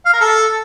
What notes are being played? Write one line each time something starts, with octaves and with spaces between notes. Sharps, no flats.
F5
A#4
A4